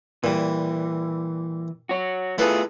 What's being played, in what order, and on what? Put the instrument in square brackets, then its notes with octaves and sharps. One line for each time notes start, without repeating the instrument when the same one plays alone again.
[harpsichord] A#2 G3 [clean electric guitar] E3
[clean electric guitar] F#4 C#5
[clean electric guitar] A3 F4 G#4 [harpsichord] E4 A4 B4